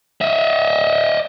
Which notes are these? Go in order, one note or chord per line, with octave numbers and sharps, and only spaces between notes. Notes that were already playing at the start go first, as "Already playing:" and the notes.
D#5 E5